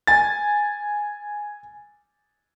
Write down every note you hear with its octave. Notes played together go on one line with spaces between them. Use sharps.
G#5 A6